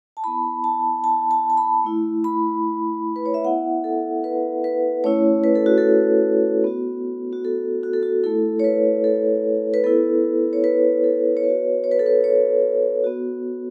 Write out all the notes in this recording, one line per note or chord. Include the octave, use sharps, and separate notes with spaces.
A5
B3 E4 B5
A5
A5
A5
A5
B5
A3 E4
B5
B4
C#5
E5
B3 E4 F#5
A4
B4
B4
A3 C#4 E4 C#5
B4
A4
F#4
A4
B3 F#4
F#4
A4
F#4
A4
F#4
A3 E4 A4
C#5
B4
A4
B4
B3 E4 A4
C#5
B4
A4
C#5
B3 F#4 B4
C#5
B4
A4
B4
C#5
B3 F#4